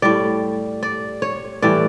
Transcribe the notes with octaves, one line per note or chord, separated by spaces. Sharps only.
A2 G3 D5
D5
C#5
A2 E3 G3 D5